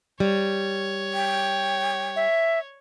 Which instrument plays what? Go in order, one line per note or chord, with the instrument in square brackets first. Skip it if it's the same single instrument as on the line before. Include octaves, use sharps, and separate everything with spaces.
[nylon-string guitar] G3 [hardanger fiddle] C#5
[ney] G5
[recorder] E5